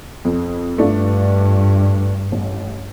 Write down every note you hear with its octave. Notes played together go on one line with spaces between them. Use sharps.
F2
G2 A3 D4 F4
A1